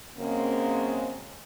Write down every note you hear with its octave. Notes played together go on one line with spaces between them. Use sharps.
F#2 C#3 G#3 A#3 C4